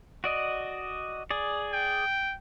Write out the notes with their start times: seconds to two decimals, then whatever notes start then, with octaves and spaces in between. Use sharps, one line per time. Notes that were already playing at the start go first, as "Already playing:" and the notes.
0.24 F#4 D5 D#5
1.31 G#4 D5
1.73 G5